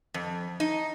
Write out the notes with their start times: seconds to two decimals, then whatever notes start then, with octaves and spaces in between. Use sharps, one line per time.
0.14 F2
0.60 D#4